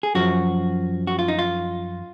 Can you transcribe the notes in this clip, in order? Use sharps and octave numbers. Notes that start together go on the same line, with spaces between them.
G#4
F#2 F3 F#4
F#4
F4
D#4
F4